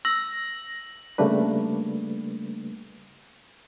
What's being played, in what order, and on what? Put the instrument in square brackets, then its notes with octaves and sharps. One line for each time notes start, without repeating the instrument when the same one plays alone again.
[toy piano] E6 [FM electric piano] A#6 [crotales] F#7
[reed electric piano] C#3 G3 A3 A#3 D4 B4